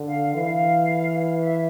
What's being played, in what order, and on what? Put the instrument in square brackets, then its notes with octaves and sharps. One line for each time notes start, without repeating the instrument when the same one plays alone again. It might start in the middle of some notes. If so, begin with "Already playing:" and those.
Already playing: [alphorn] D3
[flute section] F5
[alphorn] E3 [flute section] F5
[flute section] E5